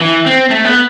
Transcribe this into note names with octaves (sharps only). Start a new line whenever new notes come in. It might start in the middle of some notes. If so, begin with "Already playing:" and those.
E3
C4
A3
B3